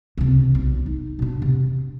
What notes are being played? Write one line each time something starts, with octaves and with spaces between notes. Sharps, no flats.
C#2 C3
B1
D#4
B2 D4
C3